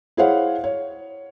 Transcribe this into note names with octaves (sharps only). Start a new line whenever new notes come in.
E4 G#4 C5 C#5 F5 F#5
C#5